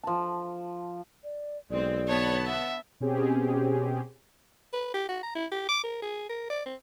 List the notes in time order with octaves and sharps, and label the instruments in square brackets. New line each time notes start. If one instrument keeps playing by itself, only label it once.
[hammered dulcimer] F3 A5
[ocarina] D5
[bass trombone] B1 [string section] G#3 C4 [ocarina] D5
[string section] D3 B3 A5 [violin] C#5
[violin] E5 [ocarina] F#5
[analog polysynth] B2 C4 C#4 G4 G#4
[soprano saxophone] B4
G4
F#4
A#5
E4
G4
D6
A#4
G#4
A#4
D5
C4